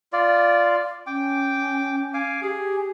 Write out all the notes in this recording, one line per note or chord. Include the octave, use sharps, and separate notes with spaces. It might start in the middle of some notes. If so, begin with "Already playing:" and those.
F4 D5
C#4 G5 D6
F5 G#5 D6
G4 G#4